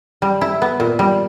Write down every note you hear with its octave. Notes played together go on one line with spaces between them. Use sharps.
G3
E4
B3
A#2
G3